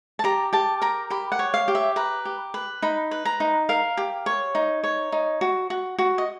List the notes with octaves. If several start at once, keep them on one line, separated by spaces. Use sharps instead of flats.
A5
G4 A#5
G4 A5
A#4 A#5
G4 B5
F#5
C#5
F5
G4
E5
B4 A#5
G4
B4
D#4 B5
B4
A#5
D#4
A#4 F5
G4
C#5
D#4
C#5
D#4
F#4
F#4
F#4
D#5